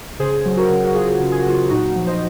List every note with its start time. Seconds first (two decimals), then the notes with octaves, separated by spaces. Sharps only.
0.19 C#3 G#4 C5
0.46 F#3
0.57 F#4 A#4
0.69 C#3
0.84 F#4
0.95 F#3 F4 G#4
1.20 C#3
1.32 G#4
1.40 F#4
1.46 F#3 F4 G#4
1.70 A#2 D#4 F#4
1.96 F3
2.07 C5 D#5